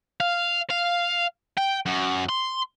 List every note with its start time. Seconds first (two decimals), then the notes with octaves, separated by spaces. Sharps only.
0.20 F5
0.70 F5
1.58 G5
1.86 F#2
2.29 C6